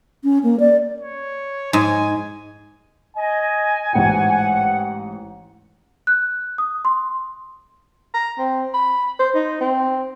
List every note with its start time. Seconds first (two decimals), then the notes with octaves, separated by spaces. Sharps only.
0.24 C#4
0.43 A#3
0.60 D5
1.01 C#5
1.73 G#2 G#5
3.17 D#5 G#5
3.93 A1 G#2 F#5 G5
6.07 F#6
6.58 D#6
6.85 C6
8.14 A#5
8.38 C4
8.74 B5
9.19 C5
9.35 D#4
9.61 C4